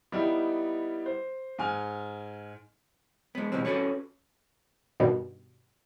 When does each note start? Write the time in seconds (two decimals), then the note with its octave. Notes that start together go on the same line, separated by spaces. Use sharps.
0.12 G3 B3 D#4 E4 G4
1.06 C5
1.59 G#2 G#5 F6
3.35 G#3 B3
3.52 B2 D#3 E3 G3 G#3 C4
3.65 C#4 F#4 A4 B4 C#5
5.00 G2 B2 D#3 G3